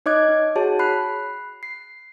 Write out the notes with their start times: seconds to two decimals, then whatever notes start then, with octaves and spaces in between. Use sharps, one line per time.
0.06 D#4 C#5 D#5 D6 F#6 G#6
0.28 D#4
0.56 F#4 G#4 C#5 A5
0.79 B5 F#6 C7
1.63 C7